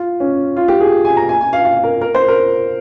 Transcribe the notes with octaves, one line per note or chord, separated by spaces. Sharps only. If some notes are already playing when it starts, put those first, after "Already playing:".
Already playing: F4
C#4
F4
G4
G#4
G#5
A#5
G#5
G#5
F5
F5
A#4
A#4
C5
A#4